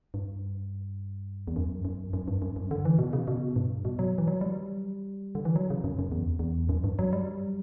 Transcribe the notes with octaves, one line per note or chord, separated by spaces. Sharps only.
G2
E2
F#2
F#2
F#2
G2
F#2
F#2
D3
E3
B2
C#3
B2
G2
B2
F#3
E3
F#3
G3
D3
E3
F#3
C#3
F#2
F#2
E2
E2
F#2
G2
F#3
G3